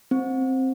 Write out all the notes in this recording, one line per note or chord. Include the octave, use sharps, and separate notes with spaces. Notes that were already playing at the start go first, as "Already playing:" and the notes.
C4